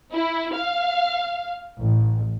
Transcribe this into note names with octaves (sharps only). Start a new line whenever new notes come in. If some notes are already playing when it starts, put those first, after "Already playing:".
E4
F5
A1